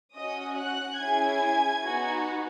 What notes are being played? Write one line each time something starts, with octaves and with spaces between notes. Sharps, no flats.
C#4 F#4 D#5 D#6
F#5 F#6
C#4 E4 G#4 G#5 G#6
B3 D#4 F#4